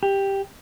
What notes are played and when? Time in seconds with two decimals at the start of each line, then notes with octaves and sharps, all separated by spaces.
0.03 G4